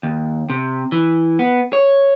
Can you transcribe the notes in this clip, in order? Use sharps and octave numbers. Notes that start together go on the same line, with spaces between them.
D#2
C3
E3
B3
C#5